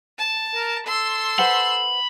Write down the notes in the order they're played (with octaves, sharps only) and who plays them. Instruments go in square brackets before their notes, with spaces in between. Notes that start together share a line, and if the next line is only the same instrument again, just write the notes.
[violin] A5
[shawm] A#4
[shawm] A4 [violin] C6 E6
[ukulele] B4 C5 F#5 [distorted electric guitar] B5